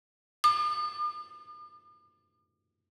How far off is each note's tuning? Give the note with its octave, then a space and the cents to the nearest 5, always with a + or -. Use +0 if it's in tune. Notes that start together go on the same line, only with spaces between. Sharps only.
D6 +45